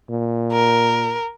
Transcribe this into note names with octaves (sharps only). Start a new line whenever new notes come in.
A#2
A#4